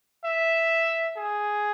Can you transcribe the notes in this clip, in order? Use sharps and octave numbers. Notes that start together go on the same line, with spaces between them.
E5
G#4